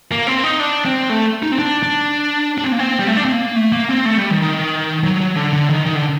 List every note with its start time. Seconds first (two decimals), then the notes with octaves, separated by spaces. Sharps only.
0.12 A#3
0.27 C4
0.44 D#4
0.60 D4
0.85 C4
1.10 A3
1.43 D#4
1.52 C4
1.59 D4
1.83 D4
2.58 D4
2.64 C4
2.72 A#3
2.79 C4
3.00 G3
3.07 A3
3.17 D4
3.25 C4
3.32 A#3
3.56 A3
3.72 A#3
3.89 C4
4.05 A3
4.17 G3
4.30 D#3
4.42 D#3
5.04 F#3
5.21 F#3
5.36 D3
5.53 D3
5.69 D#3
5.86 D#3
5.95 D3